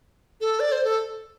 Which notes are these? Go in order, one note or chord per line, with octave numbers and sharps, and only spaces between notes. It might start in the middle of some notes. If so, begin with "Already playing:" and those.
A4
D5
C5
A4